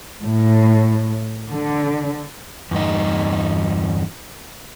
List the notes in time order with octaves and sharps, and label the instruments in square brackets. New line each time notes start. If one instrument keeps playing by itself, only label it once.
[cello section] A2
D3
[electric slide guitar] E2 G2 D#4